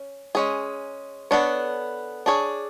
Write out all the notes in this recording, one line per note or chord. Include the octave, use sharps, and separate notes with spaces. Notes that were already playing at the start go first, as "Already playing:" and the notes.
Already playing: C#4
G#3 C#4 G#4
B3 D4 A4 C#5
D4 G#4 C#5